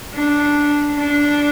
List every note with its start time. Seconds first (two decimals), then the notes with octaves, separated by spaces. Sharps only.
0.14 D4
0.97 D4